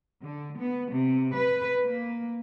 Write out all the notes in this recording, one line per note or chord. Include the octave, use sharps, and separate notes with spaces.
D3
B3
C3
B4
A#3